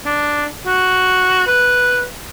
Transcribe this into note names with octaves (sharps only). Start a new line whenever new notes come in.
D4
F#4
B4